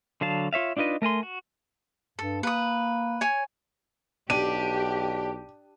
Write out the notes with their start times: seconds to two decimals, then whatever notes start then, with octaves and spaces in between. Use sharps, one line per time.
0.21 D3 F#3 F5 A5
0.53 F4 C#5 E5 F5
0.77 D4 D#4 F4 B4 D#5
1.02 A3 A#4 G#5 C6
1.23 F#4
2.19 G2 A4
2.43 A#3 B4 D#6
3.21 C#5 G#5
4.30 B1 D4 G4 D#7